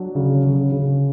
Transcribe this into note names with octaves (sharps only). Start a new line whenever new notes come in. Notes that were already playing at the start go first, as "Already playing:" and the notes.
Already playing: F#3 D4
C#3
C#3
C#3